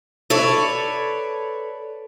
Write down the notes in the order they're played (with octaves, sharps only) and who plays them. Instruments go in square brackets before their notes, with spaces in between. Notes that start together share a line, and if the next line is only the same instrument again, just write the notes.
[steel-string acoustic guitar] A4 B4 C#5 D5